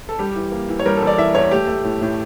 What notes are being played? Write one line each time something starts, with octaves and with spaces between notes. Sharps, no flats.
A4
G3 G4
E3
A#3
E3
C#5
G3 A#4
A4
E2
D5
E3 E5
E2 C#5
A3 G4
A3
A2
A2